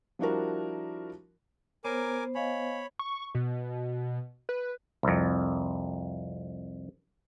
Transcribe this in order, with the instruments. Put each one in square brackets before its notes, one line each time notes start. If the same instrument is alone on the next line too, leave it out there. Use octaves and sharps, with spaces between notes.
[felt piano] F3 G3 D4 E4 F#4 A#4
[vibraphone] B3 C5 [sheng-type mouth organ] A#4 G#5 D6 [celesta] C#5 A#5
[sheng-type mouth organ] C#5 B5 [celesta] D#5 F5 G#5
[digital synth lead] C#6
B2
B4
[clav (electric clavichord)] C2 F2